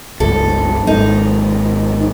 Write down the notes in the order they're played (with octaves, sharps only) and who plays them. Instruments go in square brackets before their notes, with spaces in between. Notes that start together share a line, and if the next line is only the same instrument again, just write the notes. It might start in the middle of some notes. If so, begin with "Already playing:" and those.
[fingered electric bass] F#1 C#2 G2 [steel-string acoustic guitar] A4
[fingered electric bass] G#1 G#2 F#3 [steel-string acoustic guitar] D#4